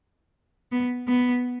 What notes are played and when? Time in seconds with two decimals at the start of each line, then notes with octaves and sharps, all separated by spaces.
0.72 B3
1.08 B3